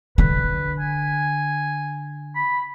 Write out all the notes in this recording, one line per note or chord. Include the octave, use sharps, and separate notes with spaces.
D3 B4
G#5
B5